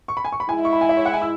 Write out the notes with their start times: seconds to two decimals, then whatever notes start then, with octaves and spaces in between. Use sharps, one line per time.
0.08 C#6
0.17 B5
0.25 G#5
0.32 C#6
0.40 B5
0.48 G#2 G#3 E4 G#5
0.65 C#6
0.73 B5
0.81 G#5
0.89 E5
0.97 C#5
1.06 F#5
1.13 G#5
1.22 E6